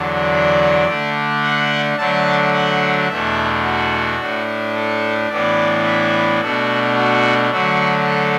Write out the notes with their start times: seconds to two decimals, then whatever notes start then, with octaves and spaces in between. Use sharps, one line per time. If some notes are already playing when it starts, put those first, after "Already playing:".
Already playing: E2 D3 F#3 D4
0.32 D5
0.87 D3 A3 D4
1.43 F#5
1.97 D3 F#3 A3 D4 A5
2.53 F#5
3.08 E2 B2 A3 D4 E5
3.63 F#4
4.19 A2 A3 D4
4.75 A4
5.29 A2 E3 B3 D4 D5
5.85 E5
6.40 B2 A3 D4 F#4
6.96 F#4
7.51 D3 F#3 A3 F#4
8.06 A4